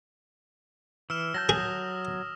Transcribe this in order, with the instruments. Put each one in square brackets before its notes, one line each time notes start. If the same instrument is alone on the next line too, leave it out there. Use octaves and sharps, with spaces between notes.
[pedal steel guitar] E3 [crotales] E6 F6 E7
[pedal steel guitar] F#3 A5 G6 [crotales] A#6
[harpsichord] G#4 [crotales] D#6